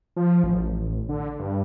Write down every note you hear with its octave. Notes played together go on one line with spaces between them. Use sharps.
F3
A1
D3
G2